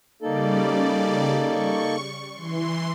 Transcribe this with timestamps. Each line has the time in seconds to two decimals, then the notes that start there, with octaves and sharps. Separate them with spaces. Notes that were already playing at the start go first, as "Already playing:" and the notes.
0.22 C#3 G3 A#3 D#4 A4 D5
1.44 C#6
2.34 E3 C6